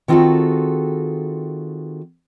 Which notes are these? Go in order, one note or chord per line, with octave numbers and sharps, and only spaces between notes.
D#3 C4 F4 F#4 G#4 A4